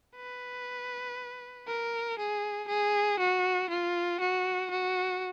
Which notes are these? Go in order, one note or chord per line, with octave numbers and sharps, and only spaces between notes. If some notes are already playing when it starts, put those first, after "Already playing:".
B4
A#4
G#4
G#4
F#4
F4
F#4
F#4